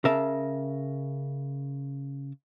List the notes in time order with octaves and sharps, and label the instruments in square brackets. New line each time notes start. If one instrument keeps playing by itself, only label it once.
[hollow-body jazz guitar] C#3 A#4 E5 A5